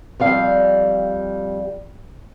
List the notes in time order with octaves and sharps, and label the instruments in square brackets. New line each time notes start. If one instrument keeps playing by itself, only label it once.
[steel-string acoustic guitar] F2 G3 F5